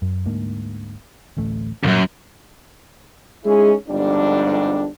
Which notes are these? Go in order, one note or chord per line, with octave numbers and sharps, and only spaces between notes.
F#2
D2 G#2 A#3
D1 A1 A3
C#2 F#2 A#2 F#3 G3
G#3 C#4 D#4 E4 G#4
G1 F2 G#2 G3 D4